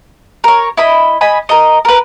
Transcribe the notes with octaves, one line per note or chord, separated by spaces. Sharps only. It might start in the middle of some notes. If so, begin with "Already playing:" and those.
A#4 C#5
E4 D#5 B5
D#5 G#5 B5
A#4 D#5
A#4 B4